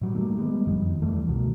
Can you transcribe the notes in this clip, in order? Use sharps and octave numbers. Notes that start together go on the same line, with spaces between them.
A2 F#3 G3
D#3 G3 A3 A#3
G3 G#3 B3
F#1 F2 D#3 F3
E2 E3 G3 A3
C2 B2 D#3